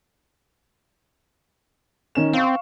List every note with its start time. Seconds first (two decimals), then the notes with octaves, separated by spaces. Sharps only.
2.15 D#3 C#4 E7
2.33 C4 F5 C#6